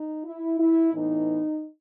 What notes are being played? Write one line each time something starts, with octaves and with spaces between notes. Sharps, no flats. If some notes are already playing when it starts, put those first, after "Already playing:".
Already playing: D#4
E4
E4
A2 E3 B3 D#4